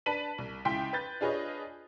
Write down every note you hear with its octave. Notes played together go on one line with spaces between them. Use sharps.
D4 B4 A5 B6 D#7 F#7
C2
C#2 E4 G5 C6 B6
B4 G6 A6
D4 F4 G#4 B4 C#5 D#5